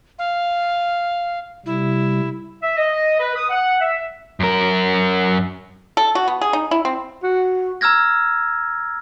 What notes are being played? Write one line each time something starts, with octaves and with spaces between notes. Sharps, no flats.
F5
C3 G3 E4
E5
D#5
B4
D#6
F#5
E5
F#2 A#4
A4
F#4
B3
G#4
D#4
E4
C4
F#4
A#5 E6 F6 G#6 A#6